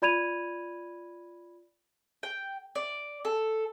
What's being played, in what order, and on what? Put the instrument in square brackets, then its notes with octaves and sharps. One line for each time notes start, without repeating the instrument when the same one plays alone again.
[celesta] F4 D5 B5 G#6 D#7 F7
[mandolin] G5
D5
A4